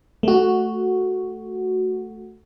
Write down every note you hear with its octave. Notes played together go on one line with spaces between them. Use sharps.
A3 F#4